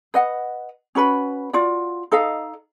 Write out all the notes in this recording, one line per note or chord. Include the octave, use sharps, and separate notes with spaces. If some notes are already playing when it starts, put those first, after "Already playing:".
B4 D#5 F#5
C#4 F#4 B4 B5
F4 F#4 D5
D#4 A4 D#5 F5